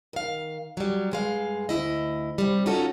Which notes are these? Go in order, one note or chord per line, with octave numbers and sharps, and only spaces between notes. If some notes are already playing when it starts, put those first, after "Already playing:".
D#3 F5
F#3 G3
G2 G#3 F5
D2 D#3 E4 D#5
C3 G3
C#4 D#4 F4 F#4 A4